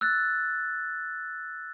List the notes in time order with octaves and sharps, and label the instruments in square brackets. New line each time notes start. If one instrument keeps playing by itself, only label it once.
[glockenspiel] E6 F#6 A6